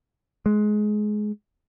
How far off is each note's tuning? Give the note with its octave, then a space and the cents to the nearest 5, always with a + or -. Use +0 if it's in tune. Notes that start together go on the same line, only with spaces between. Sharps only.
G#3 +20